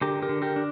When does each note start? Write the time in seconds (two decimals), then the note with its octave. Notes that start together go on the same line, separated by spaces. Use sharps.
0.01 D3 G4 A#4
0.22 G4 A#4
0.29 D3
0.42 G4 A#4
0.56 D4